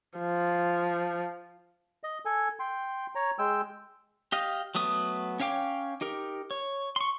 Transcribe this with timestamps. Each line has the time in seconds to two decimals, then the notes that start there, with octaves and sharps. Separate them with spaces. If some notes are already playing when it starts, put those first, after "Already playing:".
0.19 F3
2.03 D#5
2.25 A4 G#5
2.60 G5 C6
3.15 C#5 A#5
3.39 G#3 G5 E6
4.32 G4 D#5 F5
4.75 F#3 A3 B3 D#6
5.40 C#4 C#5 F5 G5 D6
6.01 D#4 G4 A#4
6.51 C#5
6.96 C6 C#6